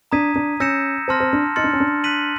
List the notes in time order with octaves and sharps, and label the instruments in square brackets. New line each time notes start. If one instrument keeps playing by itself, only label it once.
[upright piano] D4 [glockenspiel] A#5 D#6 G#6 B6 D#7
[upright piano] D4
[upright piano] C#4 [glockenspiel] E6 G6 A#6 C#7 E7
[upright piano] C4 [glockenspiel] A5 C6 F6 A#6
[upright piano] C4
D4
[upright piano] D#4 [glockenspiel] C6 F6 A6 C#7
[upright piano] D4
C#4
D4
[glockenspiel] F#6 B6 D#7 F#7